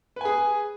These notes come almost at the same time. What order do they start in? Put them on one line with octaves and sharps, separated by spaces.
B4 G#5 G#4